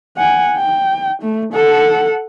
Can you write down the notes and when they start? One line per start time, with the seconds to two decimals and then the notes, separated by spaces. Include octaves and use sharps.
0.18 F#5 G#5
0.57 G5
1.22 A3
1.53 A4 F#5